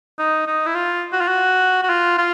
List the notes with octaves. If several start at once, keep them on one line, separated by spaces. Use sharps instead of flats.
D#4
D#4
E4
F4
F#4
F4
F#4
F#4
F4
F4